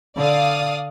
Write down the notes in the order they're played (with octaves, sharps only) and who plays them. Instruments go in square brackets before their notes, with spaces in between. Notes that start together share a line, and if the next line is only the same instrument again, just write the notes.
[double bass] D3 [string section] D5 F5 D#6